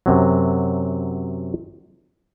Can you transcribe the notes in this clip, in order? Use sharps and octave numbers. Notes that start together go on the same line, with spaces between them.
F#2 C3 F#3